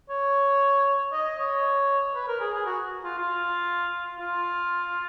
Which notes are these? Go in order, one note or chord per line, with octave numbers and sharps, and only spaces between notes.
C#5
D#5
C#5
B4
A#4
G#4
G#4
F#4
F4
F4
F4